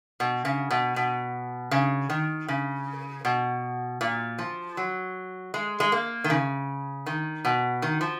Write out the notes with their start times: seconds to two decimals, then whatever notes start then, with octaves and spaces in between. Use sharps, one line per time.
0.20 B2
0.45 C#3
0.71 B2
0.96 B2
1.71 C#3
2.10 D#3
2.48 C#3
3.25 B2
4.01 A#2
4.39 F3
4.77 F#3
5.54 G#3
5.80 G#3
5.92 A#3
6.24 D#3
6.30 C#3
7.06 D#3
7.45 B2
7.82 D#3
8.01 F3